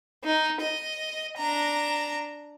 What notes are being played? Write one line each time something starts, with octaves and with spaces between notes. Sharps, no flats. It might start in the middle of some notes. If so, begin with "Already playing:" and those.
D#4
D#5
D4 A#5